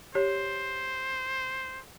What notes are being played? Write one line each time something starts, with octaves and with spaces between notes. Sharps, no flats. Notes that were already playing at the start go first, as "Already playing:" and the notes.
G4 C5 C#5